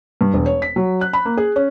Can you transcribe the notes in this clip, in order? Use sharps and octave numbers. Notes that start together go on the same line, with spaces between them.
G2
E1
C#5
B6
F#3
F#6
B5
A#3
G#4
C#4